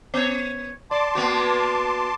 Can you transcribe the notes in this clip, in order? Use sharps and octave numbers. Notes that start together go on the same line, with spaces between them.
B3 C#5
D5 A5 C6 D6
A#3 B3 F#4